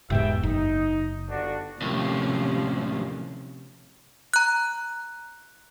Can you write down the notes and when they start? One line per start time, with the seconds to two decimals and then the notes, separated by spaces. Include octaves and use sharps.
0.10 E1 G#2 B2 G4 E5 G5
0.43 F#1 D#4
1.28 G1 D4 F#4
1.82 D#2 A2 C3 F3 C#4
4.34 A#5 F#6